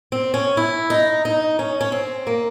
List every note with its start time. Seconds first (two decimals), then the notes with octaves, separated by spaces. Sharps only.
0.12 C4
0.34 C#4
0.57 E4
0.90 D#4
1.25 D#4
1.59 C#4
1.81 C#4
1.92 C4
2.27 A#3